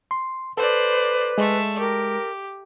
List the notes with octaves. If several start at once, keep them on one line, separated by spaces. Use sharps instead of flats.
C6
A4 B4 C5 D5
G#3 A3 E5
G4 A#4